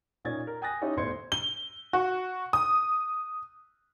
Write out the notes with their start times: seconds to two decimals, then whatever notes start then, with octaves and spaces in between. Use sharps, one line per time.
0.25 A#2 C#4 D#4 D5 G#6 A6
0.47 A#4
0.62 G5 G#5 D#6 F#6 A6 A#6
0.81 C#4 D#4 E4 G4 C#5
0.97 G1 A2 C5 C6 G#6 C#7
1.32 G7
1.93 F#4
2.53 D#6